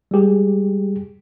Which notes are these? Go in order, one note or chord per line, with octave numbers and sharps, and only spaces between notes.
G3 G#3 G4 G#4